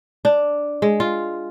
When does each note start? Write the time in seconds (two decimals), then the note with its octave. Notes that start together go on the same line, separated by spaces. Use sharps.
0.25 D4
0.82 G#3
1.00 F4